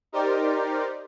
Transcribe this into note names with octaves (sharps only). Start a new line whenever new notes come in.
D#4 G4 A#4 C5 D5